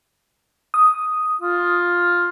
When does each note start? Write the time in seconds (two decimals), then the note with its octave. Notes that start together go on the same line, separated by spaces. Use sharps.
0.74 D#6
1.41 F4